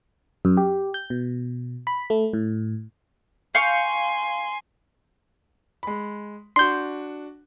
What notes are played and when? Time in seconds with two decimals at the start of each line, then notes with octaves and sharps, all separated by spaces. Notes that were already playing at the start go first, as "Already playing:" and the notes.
0.45 F#2
0.57 G4
0.94 G6
1.10 B2
1.87 B5
2.10 A3
2.33 A2
3.55 F5 G5 G#5 C6 C#6
5.83 G#3 B5
6.56 D4 F#4 C6 G6